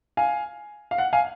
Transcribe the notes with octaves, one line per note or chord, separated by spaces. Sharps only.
F5 G#5
F5
F#5
F5 G#5